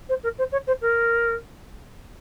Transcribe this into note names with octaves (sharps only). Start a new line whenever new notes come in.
C5
A#4
C5
C#5
C5
A#4